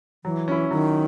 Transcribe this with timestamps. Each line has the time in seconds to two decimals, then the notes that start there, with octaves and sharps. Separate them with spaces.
0.24 E3 F#3
0.48 C#4 E4
0.71 D#3 F#3